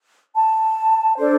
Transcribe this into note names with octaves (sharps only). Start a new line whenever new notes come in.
A5
D4 A4 C5